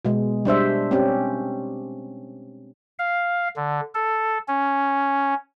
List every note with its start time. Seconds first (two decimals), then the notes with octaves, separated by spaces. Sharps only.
0.05 B2 G#3
0.45 G3 D4 C5 E5
0.91 C4 C#4 G4
2.99 F5
3.56 D3
3.94 A4
4.48 C#4